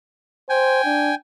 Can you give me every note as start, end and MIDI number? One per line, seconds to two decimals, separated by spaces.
0.50 0.80 72
0.50 1.15 79
0.50 1.15 80
0.85 1.12 62